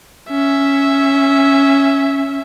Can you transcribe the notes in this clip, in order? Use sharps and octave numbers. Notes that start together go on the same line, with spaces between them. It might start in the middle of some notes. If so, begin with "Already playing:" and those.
C#4 E5